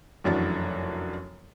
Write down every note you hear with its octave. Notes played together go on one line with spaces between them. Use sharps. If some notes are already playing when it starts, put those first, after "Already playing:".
F1 F#2 E3 D4 F#4 A6